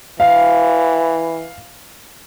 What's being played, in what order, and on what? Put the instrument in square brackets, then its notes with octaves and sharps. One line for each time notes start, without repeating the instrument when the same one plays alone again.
[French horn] E3 [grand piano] F5